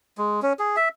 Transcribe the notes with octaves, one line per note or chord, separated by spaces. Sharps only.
G#3
C#4
G#4
E5